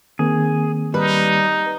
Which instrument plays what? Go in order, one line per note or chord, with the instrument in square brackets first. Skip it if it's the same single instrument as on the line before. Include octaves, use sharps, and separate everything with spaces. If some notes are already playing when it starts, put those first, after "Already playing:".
[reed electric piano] D#3 A#3 C4 [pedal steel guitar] G#4
[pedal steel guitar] G3 [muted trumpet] D#4 [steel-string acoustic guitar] B4